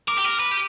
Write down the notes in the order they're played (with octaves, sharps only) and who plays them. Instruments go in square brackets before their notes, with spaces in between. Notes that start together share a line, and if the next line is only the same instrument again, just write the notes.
[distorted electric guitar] A#4 [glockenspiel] D6
[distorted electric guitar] G4
A#4
B4
G4